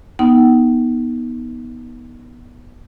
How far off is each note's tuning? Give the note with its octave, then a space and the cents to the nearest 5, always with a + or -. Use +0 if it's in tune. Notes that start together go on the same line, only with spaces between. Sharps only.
B3 -20 D#4 +10 F#5 +45